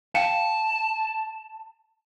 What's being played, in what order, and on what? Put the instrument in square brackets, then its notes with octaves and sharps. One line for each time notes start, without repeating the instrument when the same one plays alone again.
[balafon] F5 G5 [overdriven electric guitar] A5